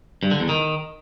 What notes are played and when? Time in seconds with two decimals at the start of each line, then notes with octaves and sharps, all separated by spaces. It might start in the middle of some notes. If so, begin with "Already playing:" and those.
0.23 G2
0.31 D3
0.40 E2
0.49 D#3